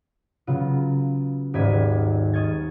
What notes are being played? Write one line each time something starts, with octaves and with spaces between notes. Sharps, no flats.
C#3 F#3 B3 F4
D#1 G#1 D5 G#6 B6 D#7
D#5 C#6 F6 G#6 A6